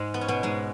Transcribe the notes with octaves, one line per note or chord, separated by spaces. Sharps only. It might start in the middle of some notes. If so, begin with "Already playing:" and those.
Already playing: G#2 G#3
B3
C#4
B2 B3
G#2 G#3